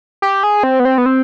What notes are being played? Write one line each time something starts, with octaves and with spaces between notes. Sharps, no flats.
G4
G#4
C4
B3
C4
B3
C4